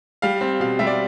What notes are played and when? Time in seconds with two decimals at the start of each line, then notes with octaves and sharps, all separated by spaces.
0.22 G3 F5
0.41 C4
0.60 B2 F5
0.79 G3 E5
0.87 D5